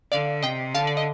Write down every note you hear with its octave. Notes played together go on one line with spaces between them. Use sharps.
D3 D5 F5
C3 D#5 G5
D3 F5 A5
D5
D#5